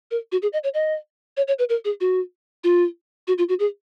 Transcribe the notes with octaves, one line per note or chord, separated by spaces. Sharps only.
A#4
F#4
G#4
D#5
C#5
D#5
C#5
C#5
B4
A#4
G#4
F#4
F4
F#4
F4
F#4
G#4